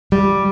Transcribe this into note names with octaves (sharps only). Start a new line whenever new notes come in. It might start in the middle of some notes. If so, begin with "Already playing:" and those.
G3